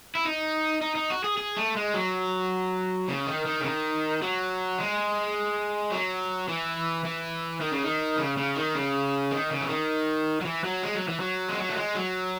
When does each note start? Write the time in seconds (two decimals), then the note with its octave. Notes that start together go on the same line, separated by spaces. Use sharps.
0.15 E4
0.25 D#4
0.82 D#4
0.95 D#4
1.10 F#4
1.24 G#4
1.37 G#4
1.57 A3
1.76 G#3
1.94 F#3
3.08 C#3
3.27 D#3
3.46 D#3
3.61 C#3
3.64 D#3
4.22 F#3
4.78 G#3
5.92 F#3
6.49 E3
7.05 E3
7.61 D#3
7.72 C#3
7.84 D#3
8.18 C#3
8.37 C#3
8.56 D#3
8.75 C#3
9.31 D#3
9.50 C#3
9.61 E3
9.69 D#3
10.41 F#3
10.45 E3
10.64 F#3
10.83 G#3
10.95 F#3
11.08 E3
11.20 F#3
11.49 G#3
11.58 F#3
11.69 A3
11.77 G#3
11.95 F#3